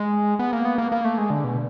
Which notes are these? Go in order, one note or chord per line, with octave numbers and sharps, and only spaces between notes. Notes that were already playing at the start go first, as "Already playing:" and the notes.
Already playing: G#3
B3
A#3
B3
A#3
A#3
A3
G#3
D3
B2